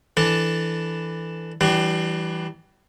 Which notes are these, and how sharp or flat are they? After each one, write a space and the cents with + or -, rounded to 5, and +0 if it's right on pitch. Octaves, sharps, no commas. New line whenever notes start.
E3 +0 D4 +0 A4 +0
E3 +0 G3 -30 D4 +30